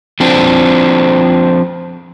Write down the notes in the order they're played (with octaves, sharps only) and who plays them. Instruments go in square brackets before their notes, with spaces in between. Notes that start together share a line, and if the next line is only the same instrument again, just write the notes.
[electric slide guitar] F3 C4 D4